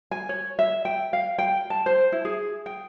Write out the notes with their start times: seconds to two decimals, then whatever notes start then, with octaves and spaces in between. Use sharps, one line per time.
0.11 G#5
0.29 C#5
0.59 E5
0.85 G5
1.13 F5
1.38 G5
1.70 A5
1.86 C5
2.12 E4
2.25 G#4
2.66 G5